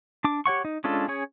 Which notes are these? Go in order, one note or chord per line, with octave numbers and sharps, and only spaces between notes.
D4 D6
G4 C#5 F#5 C#6
D#4
G#3 C#4 D4 F4 A4
C#4 G#4 C#5